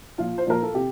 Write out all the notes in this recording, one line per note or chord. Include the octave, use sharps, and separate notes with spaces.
A#2 F3 F4
C5
A#2 F3 A#4
A4
C3 G4